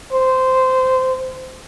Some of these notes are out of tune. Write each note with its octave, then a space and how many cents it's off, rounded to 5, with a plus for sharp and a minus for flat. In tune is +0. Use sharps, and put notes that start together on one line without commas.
C5 -15